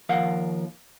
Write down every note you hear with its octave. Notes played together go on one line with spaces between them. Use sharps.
D#2 F3 A#4 F5 F#5